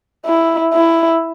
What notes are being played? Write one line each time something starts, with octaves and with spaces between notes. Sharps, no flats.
E4
E4